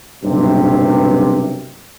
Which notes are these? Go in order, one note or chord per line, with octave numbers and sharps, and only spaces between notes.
F#1 B1 G2 C3